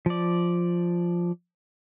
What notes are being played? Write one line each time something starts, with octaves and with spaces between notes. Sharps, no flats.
F3 D5